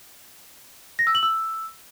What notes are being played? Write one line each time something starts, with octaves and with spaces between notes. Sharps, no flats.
A#6
E6
F#7
E6